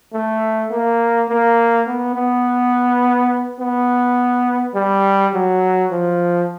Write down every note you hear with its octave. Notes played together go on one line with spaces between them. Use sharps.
A3
A#3
A#3
B3
B3
B3
G3
F#3
F3